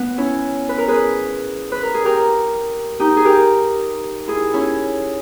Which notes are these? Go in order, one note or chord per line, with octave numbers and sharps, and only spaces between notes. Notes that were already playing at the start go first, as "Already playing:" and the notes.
Already playing: B3
C#4 E4
B4
A#4
G#4 B4
B4
A#4
G#4
G4 A#4
D#4 G4
G#4
G4 A#4
E4 G#4
C#4 E4